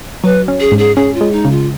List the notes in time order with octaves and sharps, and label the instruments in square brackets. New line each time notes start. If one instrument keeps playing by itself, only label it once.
[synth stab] F#3 [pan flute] B4
[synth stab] C#4
[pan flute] G#4
[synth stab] G#2
[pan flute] G#4
[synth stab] C#4 [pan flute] G#4
[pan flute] F4
[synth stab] G#3
[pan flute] D#4
[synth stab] C#3
[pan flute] F4